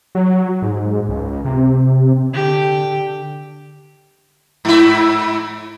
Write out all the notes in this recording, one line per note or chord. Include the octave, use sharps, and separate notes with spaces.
F#3
G#2
C#2
C3
D3 G4
G#2 E4